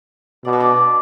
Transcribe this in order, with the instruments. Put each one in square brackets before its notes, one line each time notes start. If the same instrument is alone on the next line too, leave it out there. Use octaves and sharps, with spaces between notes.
[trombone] B2 [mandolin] D5
[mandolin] B4
D4 D5